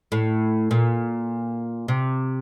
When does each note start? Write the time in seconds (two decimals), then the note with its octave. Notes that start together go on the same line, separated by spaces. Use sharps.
0.12 A2
0.71 A#2
1.88 C3